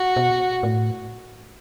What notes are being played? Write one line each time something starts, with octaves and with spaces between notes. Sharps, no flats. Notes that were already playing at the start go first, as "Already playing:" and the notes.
Already playing: F#4
B2
A2